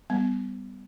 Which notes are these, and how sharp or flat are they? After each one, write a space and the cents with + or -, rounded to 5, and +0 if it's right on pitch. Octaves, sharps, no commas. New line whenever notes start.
G3 +0 B3 +20